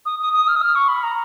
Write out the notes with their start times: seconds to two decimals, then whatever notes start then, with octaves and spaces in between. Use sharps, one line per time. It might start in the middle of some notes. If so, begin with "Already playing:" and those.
0.06 D#6
0.20 D#6
0.33 D#6
0.48 F6
0.56 D#6
0.62 F6
0.75 C#6
0.88 B5
1.03 A#5